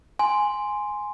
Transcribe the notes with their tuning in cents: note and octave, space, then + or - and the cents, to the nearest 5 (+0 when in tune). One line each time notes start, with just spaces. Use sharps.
G#5 +0 C6 +0